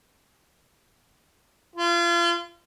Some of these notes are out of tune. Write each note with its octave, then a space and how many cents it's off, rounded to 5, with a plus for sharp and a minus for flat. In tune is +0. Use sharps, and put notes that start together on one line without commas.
F4 -35